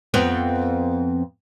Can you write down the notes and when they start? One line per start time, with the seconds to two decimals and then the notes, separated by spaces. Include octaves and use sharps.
0.14 F2 B3 C4